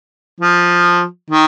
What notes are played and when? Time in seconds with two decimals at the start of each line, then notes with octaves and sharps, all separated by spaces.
0.41 F3
1.30 D#3